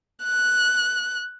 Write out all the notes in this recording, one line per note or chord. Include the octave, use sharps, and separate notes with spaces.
F#6